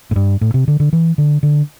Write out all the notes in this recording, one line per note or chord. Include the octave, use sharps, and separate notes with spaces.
A2
G2
A2
C3
D3
D3
E3
D3
D3